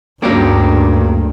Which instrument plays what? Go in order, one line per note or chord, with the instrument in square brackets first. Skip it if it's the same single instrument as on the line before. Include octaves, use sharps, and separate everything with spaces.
[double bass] D2 G2 [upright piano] C#3 F#3 [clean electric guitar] A#3 D4 G5